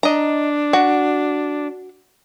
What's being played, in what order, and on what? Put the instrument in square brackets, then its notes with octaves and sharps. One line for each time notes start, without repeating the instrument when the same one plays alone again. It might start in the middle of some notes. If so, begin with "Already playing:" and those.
[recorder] D4 [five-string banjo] D#5 A#5
[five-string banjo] F#4